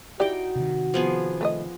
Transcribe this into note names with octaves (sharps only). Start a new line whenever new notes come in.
D#4 E4 F#4 G4 D5 G5
C3 D#3
F3 B3 G#4
A3 B4 D#5